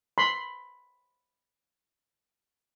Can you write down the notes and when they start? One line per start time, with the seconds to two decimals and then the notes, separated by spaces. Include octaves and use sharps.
0.18 B5 C6